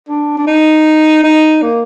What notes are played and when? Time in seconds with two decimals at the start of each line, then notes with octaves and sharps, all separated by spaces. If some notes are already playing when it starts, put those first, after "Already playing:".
0.09 D4
0.38 D4
0.47 D#4
1.24 D#4
1.62 A#3